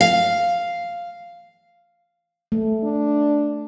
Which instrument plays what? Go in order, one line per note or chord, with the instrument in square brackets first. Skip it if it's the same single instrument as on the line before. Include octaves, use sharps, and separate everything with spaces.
[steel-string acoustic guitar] F5
[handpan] A3
[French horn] D4